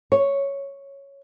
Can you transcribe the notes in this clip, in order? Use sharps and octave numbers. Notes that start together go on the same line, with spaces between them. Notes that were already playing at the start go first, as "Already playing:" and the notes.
C#5